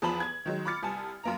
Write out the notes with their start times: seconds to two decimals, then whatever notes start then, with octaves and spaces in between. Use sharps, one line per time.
0.02 E2 F3 A5 B5 F#7
0.20 G#6
0.45 D#3 F#3 G#3
0.65 B5 D6 F6 A6 C#7
0.83 C2 G#5 A5
1.23 F#2 A#3 A#5